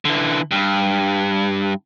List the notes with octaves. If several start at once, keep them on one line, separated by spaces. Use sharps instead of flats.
D3 E3
G2